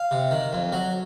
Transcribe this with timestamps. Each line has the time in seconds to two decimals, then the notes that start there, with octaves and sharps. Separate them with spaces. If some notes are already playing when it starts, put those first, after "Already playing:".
Already playing: F5
0.11 C3
0.31 D#3
0.53 F2
0.73 F#3